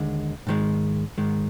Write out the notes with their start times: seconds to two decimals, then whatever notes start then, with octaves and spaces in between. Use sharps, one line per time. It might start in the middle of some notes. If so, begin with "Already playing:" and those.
Already playing: D#2 D3 G#3
0.47 G#2 D#3 G#3
1.18 G#2 D#3 G#3